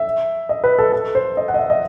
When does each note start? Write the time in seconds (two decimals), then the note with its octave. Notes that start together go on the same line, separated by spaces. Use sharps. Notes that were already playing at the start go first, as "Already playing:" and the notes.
Already playing: E5
0.49 D#5
0.64 B4
0.79 A4
0.92 A4
1.15 C5
1.37 D#5
1.48 F#5
1.54 D#5
1.58 E5
1.70 D#5